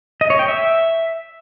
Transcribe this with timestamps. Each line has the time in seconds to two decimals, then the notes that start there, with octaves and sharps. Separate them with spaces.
0.21 D#5
0.30 C#5
0.39 G5
0.48 E5